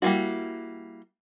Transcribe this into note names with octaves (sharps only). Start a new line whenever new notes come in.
G3 A#3 C4 E4 F#4